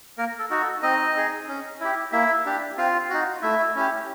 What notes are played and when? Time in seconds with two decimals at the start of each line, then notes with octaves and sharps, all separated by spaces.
0.18 A#3 A#4
0.39 A4
0.50 D#4 F#4
0.61 A4
0.82 C4 D#4 D#5
1.16 D#4 G#4
1.48 C#4
1.80 E4 G4
2.12 A#3 E4 E5
2.46 D4 G4
2.77 C4 F4 F5
3.10 D#4 F#4
3.42 A3 E4 E5
3.75 C#4 E4 G4